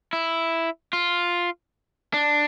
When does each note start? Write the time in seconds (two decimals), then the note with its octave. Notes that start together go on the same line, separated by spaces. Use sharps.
0.13 E4
0.93 F4
2.14 D4